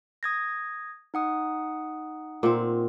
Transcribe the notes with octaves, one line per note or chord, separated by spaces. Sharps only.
D#6 G#6 A#6
D#4 F#5 D#6
A#2 C4